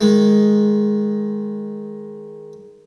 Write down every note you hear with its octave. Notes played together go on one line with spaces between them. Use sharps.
D#3 G#3